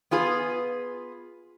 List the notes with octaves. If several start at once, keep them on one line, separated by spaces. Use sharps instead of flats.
B3 F4 G#4 B4